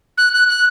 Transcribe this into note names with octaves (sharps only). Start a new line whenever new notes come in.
F#6
F#6
F#6